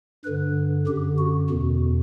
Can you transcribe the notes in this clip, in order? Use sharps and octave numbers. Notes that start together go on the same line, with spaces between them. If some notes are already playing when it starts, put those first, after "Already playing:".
G2 D3 B4
F#2 D3 G4
F#4
E2 B2